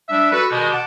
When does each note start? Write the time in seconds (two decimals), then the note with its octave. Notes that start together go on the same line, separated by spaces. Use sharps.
0.09 G3 D4 E5
0.32 F#4 A4 B4
0.50 B2 D#3 G3 G#3
0.71 F#5 A5 D6